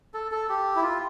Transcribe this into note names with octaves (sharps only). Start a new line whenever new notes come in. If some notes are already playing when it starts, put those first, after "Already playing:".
A4
A4
G4
E4
F4